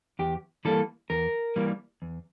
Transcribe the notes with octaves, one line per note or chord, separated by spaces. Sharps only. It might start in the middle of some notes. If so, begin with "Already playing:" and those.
E2 G4
E3 G3 A#3 A4
E2 A#4
E3 G3 A#3
E2